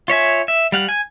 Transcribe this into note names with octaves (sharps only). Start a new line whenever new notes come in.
F4 C#5 E5 G#5
E5
G3 F5 F#5
G#5